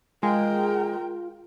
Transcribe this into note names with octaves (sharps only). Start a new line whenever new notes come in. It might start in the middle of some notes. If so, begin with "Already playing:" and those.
G#3 F4 A#4 G5